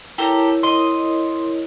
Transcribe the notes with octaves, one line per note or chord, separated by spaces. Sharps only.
E4 G4 A4 A#4 C#5 A#5
D#5 C6